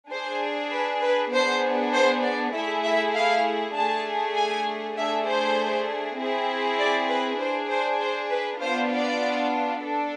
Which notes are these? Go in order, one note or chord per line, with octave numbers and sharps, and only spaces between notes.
D4 G#4 C5
B4
B4
B3 D4 G#4 C5
C5
D5
A3 E4 G#4 E5
E5
F5
A3 D4 G#4 A5
G#5
A3 D4 G#4 E5
C5
C4 E4 G#4
D5
B4
D4 G#4 C5
C5
C5
B4
B3 D4 F4 C5
D5
D4 A4